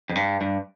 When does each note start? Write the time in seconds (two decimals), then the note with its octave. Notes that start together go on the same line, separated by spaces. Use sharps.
0.09 F2
0.15 G2
0.41 G2